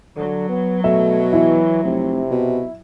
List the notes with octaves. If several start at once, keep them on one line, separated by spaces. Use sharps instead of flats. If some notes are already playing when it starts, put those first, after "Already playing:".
D3 F#3
B3
B2 A3 E5
E3 E4
F1 C3
B2